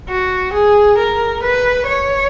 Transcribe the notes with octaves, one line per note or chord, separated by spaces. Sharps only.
F#4
G#4
A#4
B4
C#5